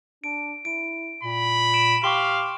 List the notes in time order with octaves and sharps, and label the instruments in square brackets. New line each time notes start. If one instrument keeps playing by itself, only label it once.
[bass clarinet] D4 [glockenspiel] D7
[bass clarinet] E4 [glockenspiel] D7
[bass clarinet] A#2 [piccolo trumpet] B5
[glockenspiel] D7 E7
[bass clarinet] G4 [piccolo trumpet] F5 [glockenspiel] C6 C#6